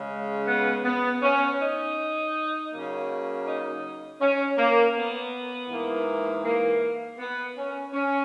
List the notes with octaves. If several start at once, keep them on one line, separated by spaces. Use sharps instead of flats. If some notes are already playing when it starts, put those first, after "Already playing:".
Already playing: C#3 G#3
B3
B3
C#4
D#4
C#3 F#3 A#3
D#4
C#4
A#3
B3
G#2 E3 A#3
A#3
B3
C#4
C#4